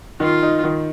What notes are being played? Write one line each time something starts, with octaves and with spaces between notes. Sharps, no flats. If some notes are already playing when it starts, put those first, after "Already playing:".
D#3 F4
D#4
D#3